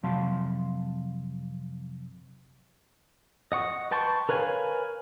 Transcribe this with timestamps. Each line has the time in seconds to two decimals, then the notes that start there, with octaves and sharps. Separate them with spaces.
0.03 F2 C3 F#3 F5 A5 C6
3.52 D#5 F#5 C#6
3.91 B4 G5 A5 C6 C#6
4.29 A#4 B4 C#5 F5 G#5